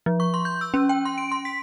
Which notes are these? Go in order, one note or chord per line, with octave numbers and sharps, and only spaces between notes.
F3
C#6
C6
G6
E6
C#4
G5
C6
D7
C6
B6